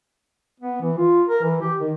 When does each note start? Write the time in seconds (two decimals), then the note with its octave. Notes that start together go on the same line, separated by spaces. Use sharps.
0.60 B3
0.81 E3
0.97 F4
1.28 A#4
1.43 E3
1.61 G4
1.80 D#3